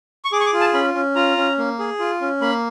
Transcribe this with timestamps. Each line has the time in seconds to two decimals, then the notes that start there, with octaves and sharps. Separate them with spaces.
0.25 C#6
0.32 G#4 D6
0.40 C#6
0.46 D6
0.53 F4
0.61 A5
0.74 C#4 B5
0.94 C#4
1.16 F4 A#5
1.37 C#4
1.58 A#3
1.79 G#4
1.99 F4
2.21 C#4
2.41 A#3 B5